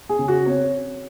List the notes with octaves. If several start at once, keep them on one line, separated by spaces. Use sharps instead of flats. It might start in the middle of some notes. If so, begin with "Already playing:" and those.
G#4
C#3
F#4
C4 C#5